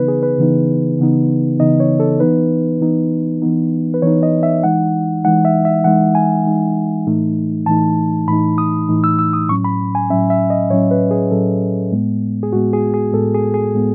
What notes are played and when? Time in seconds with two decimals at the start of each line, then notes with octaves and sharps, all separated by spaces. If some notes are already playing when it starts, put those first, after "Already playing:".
Already playing: C#3 E3 B3 D#4 B4
0.08 G#4
0.23 B4
0.38 C#3 E3 B3 D#4
0.99 C#3 E3 B3 D#4
1.59 C#3 E3 B3 D#4 D#5
1.80 C#5
2.00 A4
2.20 E3 B3 D#4 B4
2.81 E3 B3 D#4
3.42 E3 B3 D#4
3.94 B4
4.02 E3 B3 D#4 C#5
4.23 D#5
4.43 E5
4.63 E3 G#3 D#4 F#5
5.25 E3 G#3 D#4 F#5
5.45 E5
5.65 E5
5.84 E3 G#3 D#4 F#5
6.15 G#5
6.45 E3 G#3 D#4
7.07 A2 E3 A3 D#4
7.66 A2 E3 A3 D#4 A5
8.28 A2 E3 A3 D#4 B5
8.58 D#6
8.89 A2 E3 A3 D#4
9.04 E6
9.19 E6
9.33 D#6
9.49 A2 F#3 C#4 C#6
9.64 B5
9.95 G#5
10.10 A2 F#3 C#4 E5
10.30 E5
10.50 D#5
10.70 A2 F#3 C#4 C#5
10.91 B4
11.11 G#4
11.31 A2 F#3 C#4 A4
11.92 A2 G#3 B3
12.43 G#4
12.53 A2 G#3 B3 F#4
12.73 G#4
12.94 G#4
13.13 A2 G#3 B3 A4
13.34 G#4
13.54 G#4
13.75 A2 G#3 B3